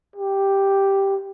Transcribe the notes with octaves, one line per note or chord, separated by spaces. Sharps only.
G4